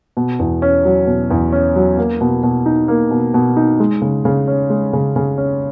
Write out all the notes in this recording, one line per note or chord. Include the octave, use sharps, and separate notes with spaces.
B2
E2
C#4
F#3
B2
E2
C#4
F#3
A#3
B2
B2
D#4
A#3
B2
B2
D#4
G#3
C#3
C#3
C#4
G#3
C#3
C#3
C#4